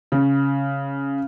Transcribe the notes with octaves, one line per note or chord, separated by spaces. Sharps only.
C#3